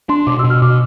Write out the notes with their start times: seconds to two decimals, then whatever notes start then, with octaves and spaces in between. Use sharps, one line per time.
0.09 D4 C6
0.27 B2 D6
0.39 E6
0.44 B2
0.50 F6
0.62 B2 D6